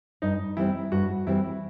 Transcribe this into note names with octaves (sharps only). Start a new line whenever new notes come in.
G2 D#4
E3 G3 C4 E4
G2 F#4
E3 G3 C4 E4